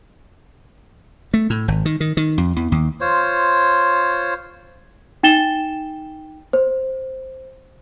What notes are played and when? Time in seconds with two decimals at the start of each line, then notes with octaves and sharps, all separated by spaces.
1.34 A3
1.50 A2
1.68 G#1
1.85 D#3
2.00 D#3
2.17 D#3
2.38 F2
2.56 E2
2.72 D#2
3.01 F4 C5 C#5
5.23 D#4 G5 A6 E7 G7
6.53 C5